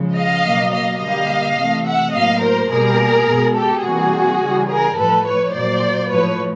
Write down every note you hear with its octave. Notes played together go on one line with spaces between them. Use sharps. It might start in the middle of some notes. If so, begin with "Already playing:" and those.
Already playing: C#3 F3 G#3
D#5 F5
B2 F#3 A#3
D#5 F5
D3 G3 A#3 D#5 F5
C3 E3 A3
E5 F#5
A2 F#3 A#3 D#5 F5
A#4 C5
B2 G3 A#3 G#4 A#4
B2 G#3
G4 A4
C3 E3 G3 A#3 F#4 G#4
C#3 E3 G3
G#4 A#4
A2 F3 A3 A4 B4
B4 C#5
A#2 F#3 A#3 C5 D5
A2 F3 A3 B4 C#5